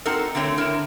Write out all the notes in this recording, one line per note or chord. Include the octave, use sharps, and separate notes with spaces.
C4 D#4 F#4 A4 A#4
D3 A3 C4 C5 C#5
D3 E4 A#4